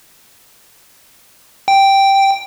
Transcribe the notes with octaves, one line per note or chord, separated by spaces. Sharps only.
G5